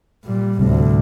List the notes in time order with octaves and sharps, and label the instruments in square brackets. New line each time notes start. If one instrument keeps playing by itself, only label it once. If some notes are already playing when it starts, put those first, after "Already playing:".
[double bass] A#2 G3
[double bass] D2 A2 [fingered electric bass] C3 G3 A3